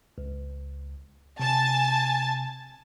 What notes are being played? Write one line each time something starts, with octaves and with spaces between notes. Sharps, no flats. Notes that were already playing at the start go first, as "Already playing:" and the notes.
C#2
C3 G#5 A5 A6